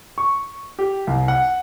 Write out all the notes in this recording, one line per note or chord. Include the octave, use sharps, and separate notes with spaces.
C#6
G4
C2
F#5